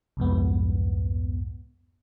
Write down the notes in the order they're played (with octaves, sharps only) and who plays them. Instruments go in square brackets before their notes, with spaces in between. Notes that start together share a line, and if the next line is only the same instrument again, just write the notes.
[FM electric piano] C2 F2 G#2 B3